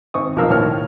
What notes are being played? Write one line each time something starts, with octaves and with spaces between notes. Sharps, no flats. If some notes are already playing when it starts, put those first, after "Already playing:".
G#1 C4 C#6 D#6
B1 F3 D4 A#4 F5 E6
A#1 D#2 A2 C5 C#5 F6